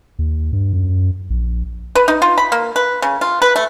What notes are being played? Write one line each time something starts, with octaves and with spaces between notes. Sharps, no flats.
D#2
G2
F#2
A#1
B4
D#4
F4
B5
A#3
B4
C#3
F4
B4
A3